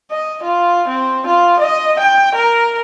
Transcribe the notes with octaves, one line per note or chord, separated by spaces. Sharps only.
D#5
F4
C4
F4
D#5
G5
A#4